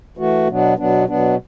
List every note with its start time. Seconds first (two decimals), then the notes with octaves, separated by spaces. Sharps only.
0.17 E3 A3 F#4
0.47 B2 F#3 B3 D4
0.77 B2 F#3 B3 D4
1.07 B2 F#3 B3 D4